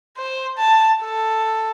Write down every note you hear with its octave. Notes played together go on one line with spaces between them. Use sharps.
C5
A5
A4